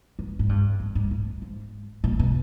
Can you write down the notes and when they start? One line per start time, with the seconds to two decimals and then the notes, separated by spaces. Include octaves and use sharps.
0.19 G#2
0.39 G#2
0.49 G2
0.80 A2
0.95 G#2
1.11 A2
1.42 G#2
2.04 A#2
2.19 B2